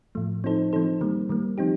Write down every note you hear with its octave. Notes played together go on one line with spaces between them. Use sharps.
A2 F3 A3
F3 C4 D#4 A4 C5
F3 C4 D#4 A4 C5
D#3 G3 A#3
D#3 G3 A#3
F3 C4 D#4 G4